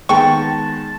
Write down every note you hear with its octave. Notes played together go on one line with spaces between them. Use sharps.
D#3 G#3 B3 G5 A5 C#6